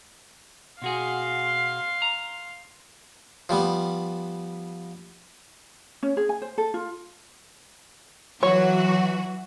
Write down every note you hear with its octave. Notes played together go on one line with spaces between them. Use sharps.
B2 F#4 G#4 F5 C6
A#5
F3 G3 B3
C#4
G#4
G#5
C5
A4
F4
E3 F#3 F#4 C#5